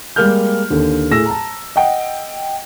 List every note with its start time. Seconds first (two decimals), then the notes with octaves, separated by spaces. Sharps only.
0.16 G3 G#3 A#3 G4 F6 G6
0.70 D#2 D3
1.11 A2 G#4 E6 A#6 E7
1.26 A5 A#5
1.76 D#5 F#5 G5